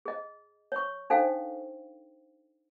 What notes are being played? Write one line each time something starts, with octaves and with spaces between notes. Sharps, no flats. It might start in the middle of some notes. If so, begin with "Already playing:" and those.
G#4 D#5
C#5 C#6
D4 D#4 A4 C5 F5 G5